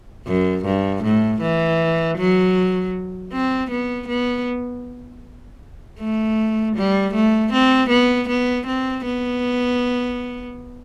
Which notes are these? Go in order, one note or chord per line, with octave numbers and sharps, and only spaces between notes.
F#2
G2
A2
E3
F#3
C4
B3
B3
A3
G3
A3
C4
B3
B3
C4
B3